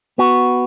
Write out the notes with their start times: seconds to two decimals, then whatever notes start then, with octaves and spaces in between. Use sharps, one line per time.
0.18 B3 F#4